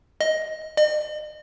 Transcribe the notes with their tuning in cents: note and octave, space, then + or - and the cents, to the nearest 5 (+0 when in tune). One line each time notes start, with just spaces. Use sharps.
D#5 +10
D#5 -40